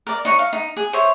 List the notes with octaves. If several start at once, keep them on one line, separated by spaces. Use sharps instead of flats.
A#4 D5
D#4 C#5 C#6
F5
D#4
G#4
C5 C#5 E5 C6